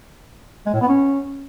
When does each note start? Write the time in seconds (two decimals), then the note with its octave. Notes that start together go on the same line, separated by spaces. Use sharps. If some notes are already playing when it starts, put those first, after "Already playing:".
0.66 G#3
0.74 A2
0.81 B3
0.88 C#4